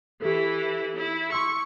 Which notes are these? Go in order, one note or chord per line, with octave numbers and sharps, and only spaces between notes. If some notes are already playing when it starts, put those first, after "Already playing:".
E3 E4 G4 A4
E4
C6 C#6 E6